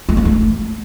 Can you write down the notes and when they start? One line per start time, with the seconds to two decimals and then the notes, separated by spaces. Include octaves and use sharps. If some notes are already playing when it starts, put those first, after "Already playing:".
0.09 A3
0.17 A#3
0.25 A3